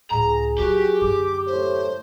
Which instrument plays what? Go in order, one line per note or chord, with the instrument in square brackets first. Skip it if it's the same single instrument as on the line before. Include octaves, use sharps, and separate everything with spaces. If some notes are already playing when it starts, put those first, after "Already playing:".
[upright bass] C#2 A2 [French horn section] G#4 [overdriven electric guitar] A#5
[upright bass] F#3 [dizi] F#4 [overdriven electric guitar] G4
[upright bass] F#2 D3 [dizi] D6
[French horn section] A2 A3 C#5 [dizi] C5